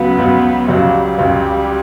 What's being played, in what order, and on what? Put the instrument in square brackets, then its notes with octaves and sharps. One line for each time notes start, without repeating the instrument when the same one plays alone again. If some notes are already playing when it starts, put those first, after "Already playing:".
Already playing: [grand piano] C#2 C#3 F#3 [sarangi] B3
[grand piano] C#2 C#3 F#3
[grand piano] C#2 C#3 F#3 [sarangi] G3
[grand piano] C#2 C#3 F#3 [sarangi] G3